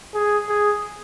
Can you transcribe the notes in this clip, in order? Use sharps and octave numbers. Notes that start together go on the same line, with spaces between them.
G#4
G#4